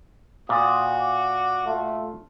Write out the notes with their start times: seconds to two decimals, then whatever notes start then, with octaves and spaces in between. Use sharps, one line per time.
0.49 A#2 F#4 D#6
1.01 D6
1.65 A3 F4